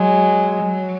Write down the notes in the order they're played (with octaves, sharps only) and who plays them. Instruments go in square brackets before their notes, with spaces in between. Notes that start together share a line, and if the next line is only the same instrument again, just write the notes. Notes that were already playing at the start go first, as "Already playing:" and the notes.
Already playing: [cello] F#3 [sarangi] G#3
[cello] F#3